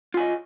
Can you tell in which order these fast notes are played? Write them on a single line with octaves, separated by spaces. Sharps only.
F4 G#5 D#5